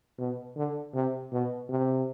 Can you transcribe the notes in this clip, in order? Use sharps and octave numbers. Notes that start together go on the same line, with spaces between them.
B2
D3
C3
B2
C3